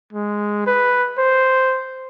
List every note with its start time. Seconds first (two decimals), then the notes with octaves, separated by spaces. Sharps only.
0.13 G#3
0.67 B4
1.18 C5